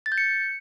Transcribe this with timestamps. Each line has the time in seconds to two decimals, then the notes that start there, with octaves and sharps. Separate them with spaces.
0.06 A6
0.12 G6
0.18 C#7